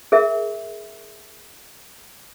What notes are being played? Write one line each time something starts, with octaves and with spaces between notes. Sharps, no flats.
G#4 A#4 E5